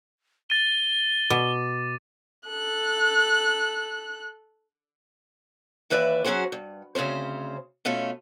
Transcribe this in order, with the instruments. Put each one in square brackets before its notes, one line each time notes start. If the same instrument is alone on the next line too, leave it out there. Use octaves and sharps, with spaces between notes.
[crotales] A6 D#7 [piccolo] G7
[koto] B2 [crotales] D6 D#7
[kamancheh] A4 F#6
[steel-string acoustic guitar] D#2 E3 B4 D5 E5
F#3 C#4 F#4 G#4 C5
G2
D2 C#3 C4 C#4 C5
B2 A3 C#4 F4 A4